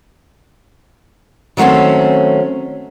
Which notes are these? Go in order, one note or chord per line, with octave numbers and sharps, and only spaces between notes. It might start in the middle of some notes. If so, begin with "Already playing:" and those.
D#3 F#3 A3 C4 C#4